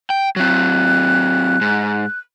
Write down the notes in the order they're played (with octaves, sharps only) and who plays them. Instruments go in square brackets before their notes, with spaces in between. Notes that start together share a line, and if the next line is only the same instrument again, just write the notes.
[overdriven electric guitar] G5
[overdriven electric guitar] F#3 C4 [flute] F#6
[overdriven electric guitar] G#2